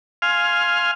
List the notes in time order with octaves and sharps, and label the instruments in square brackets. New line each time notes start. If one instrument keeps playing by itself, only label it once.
[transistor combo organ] F5 G#5 C6 F6